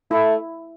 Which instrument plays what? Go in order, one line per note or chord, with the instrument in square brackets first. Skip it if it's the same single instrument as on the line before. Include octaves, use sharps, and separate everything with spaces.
[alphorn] A3 [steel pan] E4